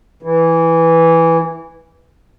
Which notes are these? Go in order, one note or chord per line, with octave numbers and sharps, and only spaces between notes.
E3